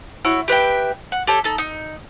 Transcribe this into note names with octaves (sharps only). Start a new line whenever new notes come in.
E4 F#4 C#5
G4 B4 E5 G5
F#5
G4 A4 C#5
D#4 A4
D#4